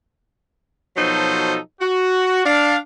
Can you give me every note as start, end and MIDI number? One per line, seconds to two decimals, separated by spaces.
0.97 1.56 47
0.97 1.56 53
0.97 1.56 54
0.97 1.56 63
0.97 1.56 69
0.97 1.56 72
1.80 2.44 66
2.44 2.76 62
2.44 2.76 77